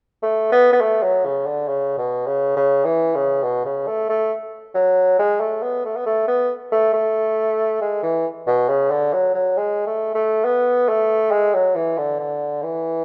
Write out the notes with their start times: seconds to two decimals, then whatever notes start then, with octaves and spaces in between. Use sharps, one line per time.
0.22 A3
0.52 B3
0.73 B3
0.81 A3
1.03 F#3
1.25 C#3
1.46 D3
1.68 C#3
1.98 B2
2.26 C#3
2.56 C#3
2.85 E3
3.15 C#3
3.43 B2
3.65 C#3
3.87 A3
4.09 A3
4.74 F#3
5.19 G#3
5.40 A3
5.63 B3
5.85 A3
5.96 B3
6.06 A3
6.28 B3
6.72 A3
6.93 A3
7.81 G#3
8.03 E3
8.47 B2
8.69 C#3
8.90 D3
9.13 F#3
9.34 F#3
9.57 G#3
9.86 A3
10.14 A3
10.45 B3
10.88 A3
11.31 G#3
11.54 F#3
11.75 E3
11.98 D3
12.19 D3
12.63 E3